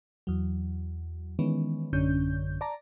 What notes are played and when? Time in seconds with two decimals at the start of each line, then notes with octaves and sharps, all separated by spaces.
0.27 E2 F#3
1.39 D#3 E3 G#3 B3 C#4
1.93 A1 F#2 D3 C#4 G6
2.61 D5 A5 A#5